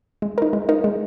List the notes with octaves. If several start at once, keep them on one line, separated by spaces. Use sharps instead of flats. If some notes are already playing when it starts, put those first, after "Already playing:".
G#3
D#4 A#4
G#3
D#4 A#4
G#3